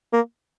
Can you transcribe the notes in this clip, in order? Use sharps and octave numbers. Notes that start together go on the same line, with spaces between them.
A#3